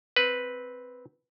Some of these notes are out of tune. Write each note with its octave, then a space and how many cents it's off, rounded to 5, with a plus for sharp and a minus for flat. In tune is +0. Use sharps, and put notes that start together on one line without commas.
C4 +0 B4 +0